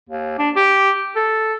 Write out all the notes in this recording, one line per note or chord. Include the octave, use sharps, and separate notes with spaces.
D#2
D4
G4
A4